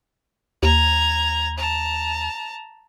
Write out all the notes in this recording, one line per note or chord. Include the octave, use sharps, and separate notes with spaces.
D#2 A#5 G#6
A5 A#5